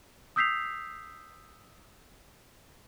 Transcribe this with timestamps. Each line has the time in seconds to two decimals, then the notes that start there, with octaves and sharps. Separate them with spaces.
0.36 D#6 E6 G6 B6 C7 F7